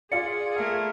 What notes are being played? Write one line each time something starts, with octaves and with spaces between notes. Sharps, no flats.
F4 G#4 D5 C6 C#7
A3 A#4 F5